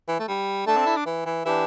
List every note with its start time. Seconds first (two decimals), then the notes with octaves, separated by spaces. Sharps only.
0.08 E3
0.20 A3
0.28 G3
0.67 A3 D4 A4 E5 A5
0.77 C4
0.86 E4
0.97 D4
1.06 E3
1.26 E3
1.45 E3 D4 G4 E5